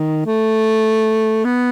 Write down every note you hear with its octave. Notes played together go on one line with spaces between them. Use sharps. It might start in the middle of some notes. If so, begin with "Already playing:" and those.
Already playing: D#3
A3
B3